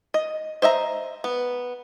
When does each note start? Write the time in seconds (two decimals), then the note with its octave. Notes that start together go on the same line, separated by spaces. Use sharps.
0.14 D#5
0.62 C5 D#5 E5 A#5
1.24 B3